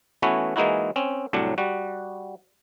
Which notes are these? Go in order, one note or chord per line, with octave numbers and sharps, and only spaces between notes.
E3 A3 B3 C#4 E4 F#4
E3 G#3 A#3 D#4 E4 F#4
C4 C#4
C2 A2 F#3 D4
G3 F#4